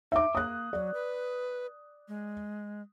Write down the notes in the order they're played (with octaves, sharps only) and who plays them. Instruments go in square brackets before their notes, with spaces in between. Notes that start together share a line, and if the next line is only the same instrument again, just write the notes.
[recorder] D#4 [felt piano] E5 D6
[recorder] A#3 [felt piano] D#6 F#6
[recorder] F#3 [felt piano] D5
[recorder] B4
G#3